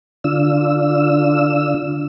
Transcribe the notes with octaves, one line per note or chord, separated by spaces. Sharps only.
D3 D4 F4 E6